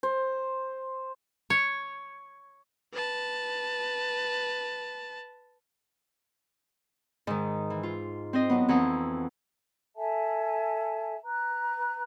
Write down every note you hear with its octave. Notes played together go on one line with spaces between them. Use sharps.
C5
C#5
B4 A5
G#2 D#3
E3
F4
C4 C5 D#5
F#3 B3
F2 E3 C4 F#5 A#5 D#6
A4 E5 G#5 A5
B4 A#5 F#6